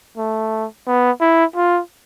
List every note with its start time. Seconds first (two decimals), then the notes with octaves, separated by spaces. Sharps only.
0.18 A3
0.87 B3
1.21 E4
1.56 F4